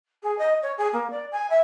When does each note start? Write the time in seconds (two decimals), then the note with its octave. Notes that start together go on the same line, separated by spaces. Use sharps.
0.23 G#4
0.38 D#5
0.62 C#5
0.77 G#4
0.93 A#3
1.10 D5
1.31 G#5
1.50 E5